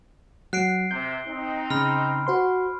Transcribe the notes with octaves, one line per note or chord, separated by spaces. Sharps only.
F#3 F#5 F#6 C7 D7
C3 G6
C4 D#4
C#3 B5 F6
F#4 C5 C6